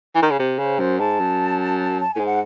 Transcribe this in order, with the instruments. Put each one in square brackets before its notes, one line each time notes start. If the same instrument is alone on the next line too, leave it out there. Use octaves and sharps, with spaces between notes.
[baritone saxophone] E3
D#3
C#3
C3
[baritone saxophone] C#3 [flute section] C5
[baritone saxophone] F#2 [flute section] C5
[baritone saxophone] G#2 [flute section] A5
[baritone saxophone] F#2
[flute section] A5
[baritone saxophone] A2 [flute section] G#5
[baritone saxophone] G#2
[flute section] F#5